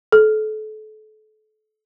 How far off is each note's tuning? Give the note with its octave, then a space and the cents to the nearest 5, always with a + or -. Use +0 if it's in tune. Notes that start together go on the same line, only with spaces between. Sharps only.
A4 -35